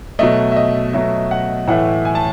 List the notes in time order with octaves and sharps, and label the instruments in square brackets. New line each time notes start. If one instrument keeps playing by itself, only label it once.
[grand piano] B2 F#3 A3 D#5
E5
D#5
B2 F#3 A3 E5
F#5
A2 E3 A3 F#5
G#5
A5